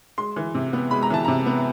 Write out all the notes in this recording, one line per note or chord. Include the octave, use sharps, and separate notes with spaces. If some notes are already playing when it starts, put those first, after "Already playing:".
G#3 C6
E3
C3
B3
G#3 B5
A#5
E3 A5
C3 A#5
B3